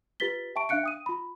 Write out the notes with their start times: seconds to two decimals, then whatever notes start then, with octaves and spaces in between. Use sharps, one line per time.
0.20 F4 G4 B4 A6 B6 G7
0.56 E5 G5 A5 C#6 D7
0.69 D4 E5 F5 F#6 C#7 D7
0.83 G5 D#6 D#7
1.06 F4 B5